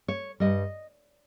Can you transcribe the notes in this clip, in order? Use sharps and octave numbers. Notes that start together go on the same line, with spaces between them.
C#5
G2 D#3 G3 D#5